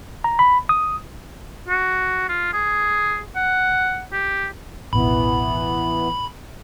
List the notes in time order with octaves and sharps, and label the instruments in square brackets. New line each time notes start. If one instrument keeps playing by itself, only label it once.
[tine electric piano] A#5
B5
D#6
[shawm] F#4
F4
G#4
F#5
G4
[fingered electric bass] A1 D#2 B2 [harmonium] E3 B3 [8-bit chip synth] B5